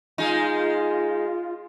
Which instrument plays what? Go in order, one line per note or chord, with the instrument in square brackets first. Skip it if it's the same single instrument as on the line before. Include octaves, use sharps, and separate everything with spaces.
[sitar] G#3 D#4 [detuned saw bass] F4